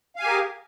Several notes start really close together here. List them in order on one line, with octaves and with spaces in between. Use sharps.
F5 G#5 G4 A#4 G#4